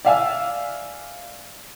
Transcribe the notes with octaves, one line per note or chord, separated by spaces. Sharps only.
D5 E5 F5 G#5 E6